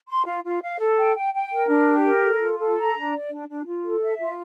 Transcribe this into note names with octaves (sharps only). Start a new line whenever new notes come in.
C6
F4
F4
F5
A4
G5
G5
G5
A#4
D4
G4
A#4
A4
F4
A4
A#5
D4
D5
D4
D4
F4
A4
E5
F4